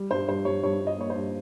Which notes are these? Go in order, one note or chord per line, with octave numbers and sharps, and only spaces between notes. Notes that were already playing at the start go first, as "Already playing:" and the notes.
Already playing: G3
G2 C5
G2 C5
G2 C#5
G2 C#5
G2
D#5
A#3 C#5
C5
G2